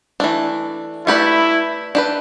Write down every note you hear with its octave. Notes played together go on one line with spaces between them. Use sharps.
E3 A3 D4
A3 E4 G4 B4 D5
D4 G4 B4